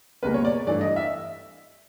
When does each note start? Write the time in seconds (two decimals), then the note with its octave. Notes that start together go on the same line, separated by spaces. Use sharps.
0.23 C#2 B2 G3 A#3 B4
0.34 C#5
0.45 D5
0.67 G2 E3 A3 D4 D5
0.81 D#5
0.96 E5